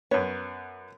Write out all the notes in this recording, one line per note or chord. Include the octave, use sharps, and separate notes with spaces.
F#2 B3 C#5